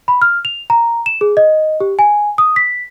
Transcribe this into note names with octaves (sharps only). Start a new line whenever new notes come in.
B5
F6
F7
A#5
E7
G#4
D#5
G4
G#5
D#6
B6